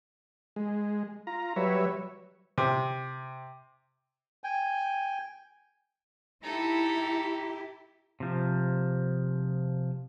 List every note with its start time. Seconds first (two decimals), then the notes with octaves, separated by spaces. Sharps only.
0.56 G#3
1.27 F4 A#5
1.56 F#3 G3 B4 C#5 E5
2.58 C3
4.44 G5 G#5
6.43 D#4 E4 G4 A4
8.20 C3 F3